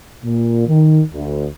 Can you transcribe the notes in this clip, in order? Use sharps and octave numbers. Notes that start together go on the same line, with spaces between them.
A#2
D#3
D2